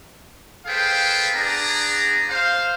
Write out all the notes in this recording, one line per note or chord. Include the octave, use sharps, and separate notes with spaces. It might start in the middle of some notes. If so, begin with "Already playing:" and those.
G#4 A4 B4 C5 F5 G5
B3 D4 G#4 D5 A#5
C5 F5